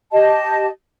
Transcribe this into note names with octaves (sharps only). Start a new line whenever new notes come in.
G4 D#5 A5